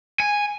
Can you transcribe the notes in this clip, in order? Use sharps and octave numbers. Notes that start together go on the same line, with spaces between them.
G#5